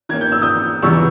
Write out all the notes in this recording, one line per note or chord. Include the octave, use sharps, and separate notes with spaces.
D#3 A#3 C#4 G#6
G6
E6
D#6 G6
E2 C#3 E3 G3 B3 C#6 E6